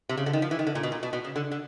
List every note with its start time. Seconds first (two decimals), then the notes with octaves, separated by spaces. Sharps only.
0.09 C3
0.17 C#3
0.26 D3
0.33 D#3
0.42 F3
0.51 E3
0.59 D#3
0.67 D3
0.75 A#2
0.83 B2
0.92 A#2
1.03 B2
1.13 B2
1.24 C#3
1.36 D3
1.52 D3